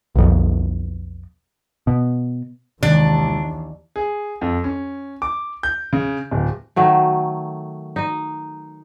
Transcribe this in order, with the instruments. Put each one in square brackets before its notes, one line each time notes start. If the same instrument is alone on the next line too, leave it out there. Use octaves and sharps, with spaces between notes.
[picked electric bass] B1 F2
B2
[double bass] D#2 E3 [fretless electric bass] C3 D#3 G#3 [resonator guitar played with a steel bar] D4
[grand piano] G#4
F2
C#4
D6
G6
C#3
D1
[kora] D#3 F#3 A3
D#4 D#5